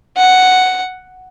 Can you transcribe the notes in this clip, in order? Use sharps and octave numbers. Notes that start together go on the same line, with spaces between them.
F#5